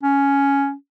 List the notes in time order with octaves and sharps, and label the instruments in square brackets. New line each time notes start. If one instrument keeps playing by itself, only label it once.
[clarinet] C#4